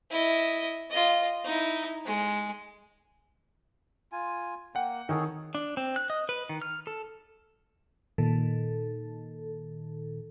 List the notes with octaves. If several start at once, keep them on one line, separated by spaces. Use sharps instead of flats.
E4 D#5
F4 D#5
D#4 E4
G#3
F4 G#5
A#3 F#5 G5
D#3 G#4 A4 C#5
D4
C4
F#6
D#5
B4
D#3
F6
A4
A#2 D#3 A4